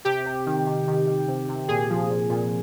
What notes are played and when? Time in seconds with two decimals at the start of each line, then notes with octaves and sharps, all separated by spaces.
0.05 C3 G4
0.26 C3
0.46 D#3
0.67 D#3
0.87 D#3
1.07 D#3
1.28 C3
1.49 C3
1.68 A#2 G#4
1.90 F3
2.10 A#2
2.30 A#2